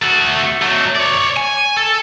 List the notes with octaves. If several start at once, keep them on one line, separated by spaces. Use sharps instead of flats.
A3 F#4
F#3 A3
C#5 D5
G#5
A4